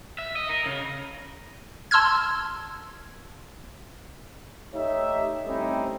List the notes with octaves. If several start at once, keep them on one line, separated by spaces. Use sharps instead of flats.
E5
D#5
A#4
C#3
A5 C6 E6 F6 G#6
A3 D#4 G4 C#5 E5
G3 A3 C4 C#4 D#4 E4